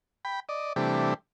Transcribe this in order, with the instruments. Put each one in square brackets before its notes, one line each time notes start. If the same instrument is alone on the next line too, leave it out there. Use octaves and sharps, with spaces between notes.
[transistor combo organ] G5 B5
D5 D#5
C3 E3 G3 A3 D4 G4